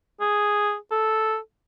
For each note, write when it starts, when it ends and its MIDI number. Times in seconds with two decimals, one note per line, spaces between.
0.20 0.75 68
0.91 1.38 69